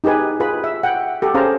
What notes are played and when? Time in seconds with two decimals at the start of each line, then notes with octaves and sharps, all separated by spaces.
0.04 D#4 G4 G#4 B4 G#5
0.40 F4 G#4 B4 B5
0.64 E5
0.83 F#5 G5
1.22 G4 A4
1.34 C#4 G#4 C5 F5 A5 A#5